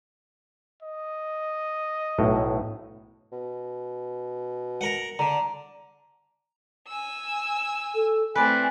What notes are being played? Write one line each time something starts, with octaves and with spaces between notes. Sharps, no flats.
D#5
B1 A2
B2
A#4 F#5
D3 A#5
G#5 E6
A4
A3 C4 E4 B4 D5 G#5